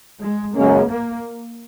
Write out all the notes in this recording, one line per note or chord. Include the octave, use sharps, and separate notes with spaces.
G#3
F#2 C#3 G#3 A#3 C#4
A#3